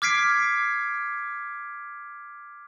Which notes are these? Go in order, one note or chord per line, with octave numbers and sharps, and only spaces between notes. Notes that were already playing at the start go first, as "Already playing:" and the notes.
D6 F6 G#6 B6 C7 D7